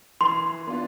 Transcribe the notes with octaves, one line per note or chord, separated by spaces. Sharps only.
E3 C6
B3 D4 F4